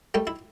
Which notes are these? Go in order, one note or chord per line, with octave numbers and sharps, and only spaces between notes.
G3 A3 G4
E4